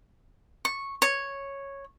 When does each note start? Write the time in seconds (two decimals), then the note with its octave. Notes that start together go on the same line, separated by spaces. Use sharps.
0.65 C#6
1.02 C#5